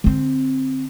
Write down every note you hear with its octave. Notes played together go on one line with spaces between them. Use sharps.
D3 C4